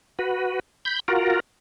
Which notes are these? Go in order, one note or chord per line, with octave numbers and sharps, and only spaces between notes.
F#4 B4
B5 G6
F4 F#4 A#4